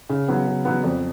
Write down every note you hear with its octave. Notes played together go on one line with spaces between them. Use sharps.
C#3
F#3 B3
C#3
F#3 B3
F2